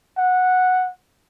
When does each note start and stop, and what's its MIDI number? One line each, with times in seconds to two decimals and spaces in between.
0.18 0.91 78